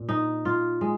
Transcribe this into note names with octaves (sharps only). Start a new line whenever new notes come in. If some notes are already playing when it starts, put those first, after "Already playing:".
Already playing: A#2
D#4
F4
G#3